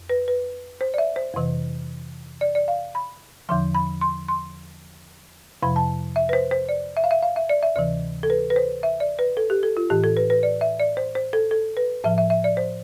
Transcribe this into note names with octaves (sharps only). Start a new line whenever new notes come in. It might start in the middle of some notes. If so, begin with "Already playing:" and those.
Already playing: F2
B4
B4
C5
D5
E5
C5
F2 C3 E3
D5
D5
F5
B5
E2 D3 F3 C6
B5
C6
C6
F2 C3 F3 B5
A5
E5
B4
C5
C5
D5
E5
F5
E5
F5
E5
D5
E5
D2 C3 E3 D5
A4
B4
B4
C5
E5
D5
B4
A4
G4
A4
F4
A2 E3 G4
A4
B4
B4
D5
E5
D5
C5
C5
A4
A4
B4
A2 F3 E5
E5
E5
D5
C5